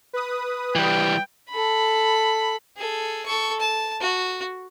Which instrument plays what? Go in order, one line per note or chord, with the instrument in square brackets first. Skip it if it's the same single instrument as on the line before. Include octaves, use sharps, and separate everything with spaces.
[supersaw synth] B4 D#6
[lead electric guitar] E3 G3 [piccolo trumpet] G5
[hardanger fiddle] A4 B5
G#4 A4
A4 C#6
A5
F#4